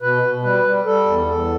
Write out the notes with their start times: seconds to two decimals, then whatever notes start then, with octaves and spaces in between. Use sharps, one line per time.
0.01 B2 B4
0.23 B2
0.43 G3 B4
0.65 G3
0.84 G3 A4
1.05 E2
1.26 E2 A4